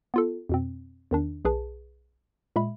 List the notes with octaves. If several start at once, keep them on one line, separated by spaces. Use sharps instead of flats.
B3 F4 A4
F2 B2 C4
E2 D#3 D4
B1 G#4 B4 A5
A#2 G#3 E5 B5